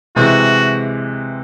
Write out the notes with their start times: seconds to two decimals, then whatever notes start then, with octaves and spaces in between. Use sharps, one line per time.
0.16 C3 E3 G#3 F#4